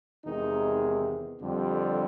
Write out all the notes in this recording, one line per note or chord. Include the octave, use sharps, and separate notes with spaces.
E2 C3 D#3 G#3 D#4
F2 D3 G3